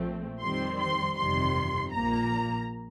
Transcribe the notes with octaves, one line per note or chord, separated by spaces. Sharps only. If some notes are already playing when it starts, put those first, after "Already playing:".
Already playing: A#1 A#2 F3 A3 C4
F2 D#3 G3 C4 C6
C6
G1 F2 C3 D#3 G3 C6
A#1 A#2 F3 A#3 A#5